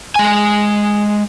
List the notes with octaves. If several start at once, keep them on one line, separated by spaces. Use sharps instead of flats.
G#3 G#5